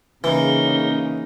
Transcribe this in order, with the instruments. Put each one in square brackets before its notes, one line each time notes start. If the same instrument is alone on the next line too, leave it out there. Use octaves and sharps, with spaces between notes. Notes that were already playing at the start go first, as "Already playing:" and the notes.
[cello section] C#3 [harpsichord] E3 [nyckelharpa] A#3 D#4 [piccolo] G7